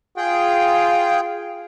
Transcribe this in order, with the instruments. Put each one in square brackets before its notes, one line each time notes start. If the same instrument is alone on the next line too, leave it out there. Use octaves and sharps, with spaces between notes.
[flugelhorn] F4 [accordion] G#4 G5